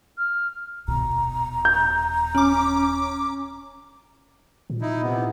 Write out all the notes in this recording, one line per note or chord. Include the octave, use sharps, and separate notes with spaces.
F6
D#1 B2 A#5
G6
C#4 D6
A#2
D#4 E4
C3 B3